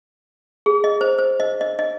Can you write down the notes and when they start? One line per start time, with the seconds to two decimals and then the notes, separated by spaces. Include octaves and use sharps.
0.66 G#4
0.84 D#5
1.01 C5
1.19 C5
1.40 D#5
1.61 D#5
1.79 D#5